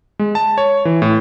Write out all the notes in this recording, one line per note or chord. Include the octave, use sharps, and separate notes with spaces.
G#3
A5
C#5
E3
A2